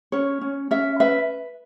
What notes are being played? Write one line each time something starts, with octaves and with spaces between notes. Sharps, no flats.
C#4 C#5
C#4
C#4 E5
B4 E5